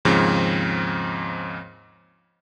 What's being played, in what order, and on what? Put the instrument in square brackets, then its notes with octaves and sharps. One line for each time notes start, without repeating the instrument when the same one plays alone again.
[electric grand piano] D#2 G#2 C#3 F3 C4